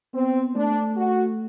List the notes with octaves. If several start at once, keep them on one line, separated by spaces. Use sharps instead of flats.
B3 C4
A3 D4
F#4